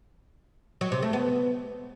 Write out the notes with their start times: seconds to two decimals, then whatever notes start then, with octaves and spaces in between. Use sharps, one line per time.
0.81 F#3
0.92 C3
1.02 A3
1.13 B3